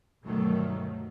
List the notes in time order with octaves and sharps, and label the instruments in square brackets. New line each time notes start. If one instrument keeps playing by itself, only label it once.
[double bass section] D2 G2 B2 D#3 F#3 A3